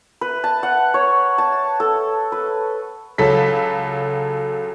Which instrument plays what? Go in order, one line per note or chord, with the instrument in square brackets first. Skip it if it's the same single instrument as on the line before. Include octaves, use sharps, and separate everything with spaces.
[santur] B4
A5
F#5
C#5
A5
A4
B4
[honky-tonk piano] C#2 F#3 A4 B6